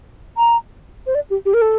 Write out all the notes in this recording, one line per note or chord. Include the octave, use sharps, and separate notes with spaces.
A#5
C5
D5
G4
G4
A#4
A4